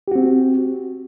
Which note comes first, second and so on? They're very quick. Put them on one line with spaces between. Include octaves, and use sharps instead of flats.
G4 F#4 C4